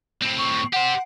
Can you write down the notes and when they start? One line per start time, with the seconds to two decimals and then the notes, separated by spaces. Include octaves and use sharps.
0.22 A2 C4
0.38 C#6
0.73 G4 C5 F#5